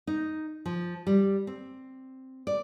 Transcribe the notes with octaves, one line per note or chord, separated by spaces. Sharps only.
D#4
F3
G3
C4
D5